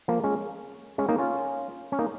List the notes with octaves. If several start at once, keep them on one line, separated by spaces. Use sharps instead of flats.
F3 A#3
G#3 C#4
G#3 C#4
A#3 D#4
C#4 F4
C#4
A#3 D#4